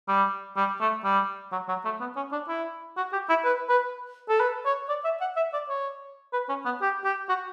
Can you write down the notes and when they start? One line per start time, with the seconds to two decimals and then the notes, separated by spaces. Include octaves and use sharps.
0.08 G3
0.57 G3
0.80 A3
1.04 G3
1.52 F#3
1.69 F#3
1.85 A3
2.00 B3
2.16 C#4
2.32 D4
2.48 E4
2.97 F#4
3.13 G4
3.29 E4
3.44 B4
3.69 B4
4.29 A4
4.40 B4
4.65 C#5
4.89 D5
5.05 E5
5.21 F#5
5.37 E5
5.53 D5
5.69 C#5
6.33 B4
6.49 C#4
6.65 B3
6.82 G4
7.05 G4
7.29 F#4